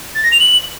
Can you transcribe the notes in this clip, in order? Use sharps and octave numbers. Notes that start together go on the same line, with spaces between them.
A6
A#6
F7
F#7